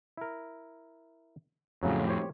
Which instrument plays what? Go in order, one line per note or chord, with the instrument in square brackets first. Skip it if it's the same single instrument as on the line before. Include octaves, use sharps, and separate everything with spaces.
[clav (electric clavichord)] E4 A#4
[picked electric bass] F2 A2 [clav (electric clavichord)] C#3 F#3
[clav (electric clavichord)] G4 C5 C#5